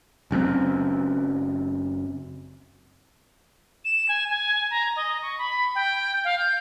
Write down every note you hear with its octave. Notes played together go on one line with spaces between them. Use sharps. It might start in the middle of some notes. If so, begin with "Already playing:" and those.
F#1 F#2 A2 C4
E7
G#5
G#5
A#5
D#5
C#6
B5
G5
F5
G6